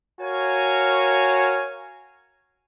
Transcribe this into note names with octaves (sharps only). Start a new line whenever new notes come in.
F#4 A#4 C#5 F5 G#5